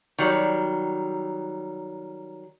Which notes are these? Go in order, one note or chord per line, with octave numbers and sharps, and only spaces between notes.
D#3 F#3 G3